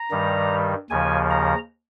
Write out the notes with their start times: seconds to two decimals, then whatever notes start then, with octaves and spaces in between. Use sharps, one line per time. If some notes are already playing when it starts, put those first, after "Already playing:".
Already playing: A#5
0.11 G2 D#3 G3
0.90 D#2 C#3 F3 G#5
1.31 A#5